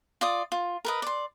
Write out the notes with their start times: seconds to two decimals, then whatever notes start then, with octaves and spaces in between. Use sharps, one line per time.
0.21 F4 D5 D#6
0.52 F4
0.85 A#4 B4 D#5
1.02 D5 C6